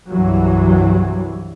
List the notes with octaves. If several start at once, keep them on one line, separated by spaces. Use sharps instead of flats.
C2 G2 E3 F#3